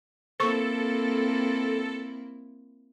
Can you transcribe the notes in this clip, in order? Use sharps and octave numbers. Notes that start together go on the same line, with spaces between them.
A#3 C4 E4 A4 C5 C#6